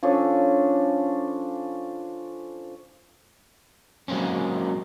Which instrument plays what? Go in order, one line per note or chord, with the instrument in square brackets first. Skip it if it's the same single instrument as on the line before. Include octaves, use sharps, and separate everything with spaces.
[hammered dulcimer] F3 C#4 D4 A4
[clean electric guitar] F#3 G#3 A#3 C4 C#4